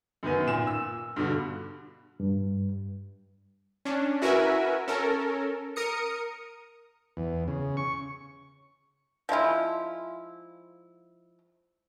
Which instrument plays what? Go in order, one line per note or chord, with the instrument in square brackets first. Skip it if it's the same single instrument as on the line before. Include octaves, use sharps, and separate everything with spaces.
[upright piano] F#2 D#3 B3 G#5
A#2 E7
E6
G2 B2 D3
[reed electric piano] G2
[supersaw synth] C#4 D4
E4 F#4 A#4 B4 E5 G#5
C#4 A4 A#4
A#4 D#6 C#7
[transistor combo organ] E2
C#3
C#6
[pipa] F3 G#3 E4 F4